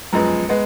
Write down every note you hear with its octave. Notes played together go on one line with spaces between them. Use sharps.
F#2 F3 G#3 B3 A#5
G#3 B3